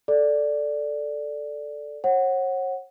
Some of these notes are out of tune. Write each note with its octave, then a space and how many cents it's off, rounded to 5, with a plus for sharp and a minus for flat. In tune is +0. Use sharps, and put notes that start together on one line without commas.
A4 +0 D5 +0
C#5 -40 F#5 +0